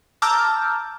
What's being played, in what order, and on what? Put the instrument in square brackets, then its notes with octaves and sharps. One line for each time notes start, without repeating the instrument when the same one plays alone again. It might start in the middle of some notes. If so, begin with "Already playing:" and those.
[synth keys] A5 A#5 D6 E6 F6 G6